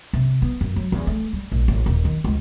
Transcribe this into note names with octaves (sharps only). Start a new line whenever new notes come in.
C3
B3
F#2
F#3
E2
A3
G3
A#1
A1
D#1
D#3
C#2